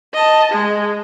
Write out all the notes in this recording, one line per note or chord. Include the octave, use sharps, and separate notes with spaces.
D#5 A5
G#3